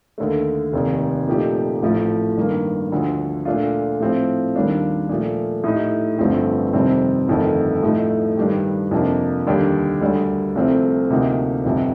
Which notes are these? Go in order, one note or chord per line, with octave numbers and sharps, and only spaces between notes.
D#2 D3 A3
F1 D#2 D#3
A#2 F3 A3 D#4 G4
A1 A2 F3 A3
G2 D#3 A#3
D2 D3 F3
A#2 A3 D4 F4
A2 F3 C4 F4
D#2 D#3 G3 D4 F4
A#2 F3 A3
A2 A3 D#4 G4
G1 G2 F3 A3 C4
F2 C3 D#3 G3 C4
G1 F2 D#3 A3
A2 F3 A3 D#4
G2 D#3 G3 D4 G4
F2 C3 F3 A#3 D4
D#2 D3 G3 D4 G4
D2 D3 G3
C2 C3 F3 A3 C4
D2 C3 F3 A#3 D#4
G1 F2 C3